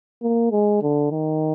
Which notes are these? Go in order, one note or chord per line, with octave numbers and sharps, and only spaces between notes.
A#3
G#3
D3
D#3